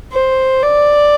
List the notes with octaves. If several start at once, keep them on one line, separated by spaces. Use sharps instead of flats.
C5
D5